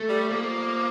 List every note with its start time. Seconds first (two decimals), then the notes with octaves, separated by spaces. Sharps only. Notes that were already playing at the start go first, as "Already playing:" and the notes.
Already playing: A3
0.09 G3
0.29 F3 A#3